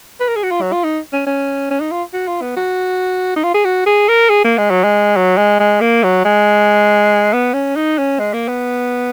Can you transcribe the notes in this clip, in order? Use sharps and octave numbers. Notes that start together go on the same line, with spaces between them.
B4
A#4
G#4
F#4
F4
F#3
F4
D#4
C#4
C#4
C#4
D#4
F4
F#4
F4
B3
F#4
D#4
F4
G#4
F#4
G#4
A#4
G#4
A#3
G#3
F#3
G#3
F#3
G#3
G#3
A#3
F#3
G#3
B3
C#4
D#4
C#4
G#3
A#3
B3